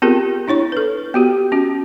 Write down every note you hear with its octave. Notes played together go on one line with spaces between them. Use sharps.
B3 C4 F4 G4 G#4 A#4
D4 E4 C#5 C#6
A4 B4
B3 F#4 G4
C#4 F#4